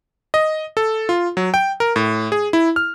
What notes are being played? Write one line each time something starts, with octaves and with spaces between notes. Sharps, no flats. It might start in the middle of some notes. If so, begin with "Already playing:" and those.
D#5
A4
F4
F#3
G5
A#4
A2
G#4
E4
F6